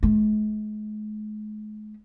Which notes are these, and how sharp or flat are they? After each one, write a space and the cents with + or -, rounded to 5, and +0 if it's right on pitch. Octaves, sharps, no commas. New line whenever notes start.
G#3 +45